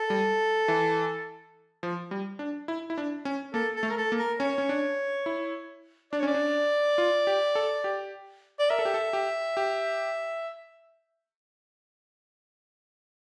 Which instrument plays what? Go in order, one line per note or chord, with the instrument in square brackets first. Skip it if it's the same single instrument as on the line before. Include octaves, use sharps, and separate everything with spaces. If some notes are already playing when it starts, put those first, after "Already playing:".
Already playing: [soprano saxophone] A4
[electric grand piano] G3
E3
F3
G3
D4
E4
E4
D4
C#4
[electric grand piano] A#3 [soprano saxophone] A4
[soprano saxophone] A4
[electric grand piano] A3
[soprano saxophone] A#4
A4
[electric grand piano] A#3
[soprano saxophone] A#4
[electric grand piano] C#4 [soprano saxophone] C#5
[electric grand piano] C#4
D4
E4
[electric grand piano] D4 [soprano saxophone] D5
[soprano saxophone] C#5
[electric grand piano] C#4 [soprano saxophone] D5
[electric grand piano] D4
F4
G4
A4
G4
[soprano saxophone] D5
[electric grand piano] A#4 [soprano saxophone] E5
[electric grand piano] A4
G4
A4
G4
G4